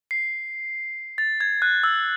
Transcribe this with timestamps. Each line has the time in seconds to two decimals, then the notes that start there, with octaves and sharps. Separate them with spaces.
0.11 C7
1.18 A6
1.41 G#6
1.62 F#6
1.84 E6